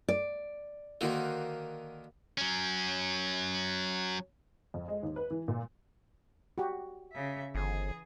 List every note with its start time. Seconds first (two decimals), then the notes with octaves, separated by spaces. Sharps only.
0.08 D5
1.01 D3 D#3 A#3 F#4 C5
2.38 F#3 C#4
4.74 F2
4.88 G#3
5.03 D#2
5.16 B4
5.30 E3
5.48 A#2
6.58 F#4 G4
7.12 C#3 E5
7.55 G1 E3 G#4